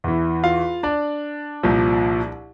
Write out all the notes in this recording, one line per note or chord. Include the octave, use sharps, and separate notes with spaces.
E2 E3
F4 F5
D4 D5
C2 A#2 F3